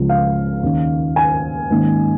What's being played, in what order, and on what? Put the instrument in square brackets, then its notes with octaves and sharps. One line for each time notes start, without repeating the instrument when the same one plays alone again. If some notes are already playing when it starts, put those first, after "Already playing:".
Already playing: [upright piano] C#2 C#3 F3
F5
D#2 D#3 C#4
G#5
G#2 D#3 A#3 C#4